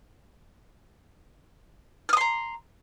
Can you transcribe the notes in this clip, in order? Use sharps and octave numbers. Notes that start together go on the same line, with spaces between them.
A#5 C6 D#6 F6